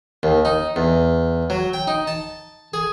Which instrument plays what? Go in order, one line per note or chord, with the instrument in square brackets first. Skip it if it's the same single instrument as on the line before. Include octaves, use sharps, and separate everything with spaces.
[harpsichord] D#2
D#4
E2
F#3
G5
D#4
A5
G#4